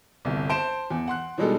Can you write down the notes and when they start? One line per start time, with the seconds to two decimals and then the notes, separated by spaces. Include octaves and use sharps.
0.25 G1 C2
0.50 C5 A5 D7 E7
0.90 E2
1.08 F#5 C6 F#6
1.38 B2 E3 G3 G#3 D#4 A4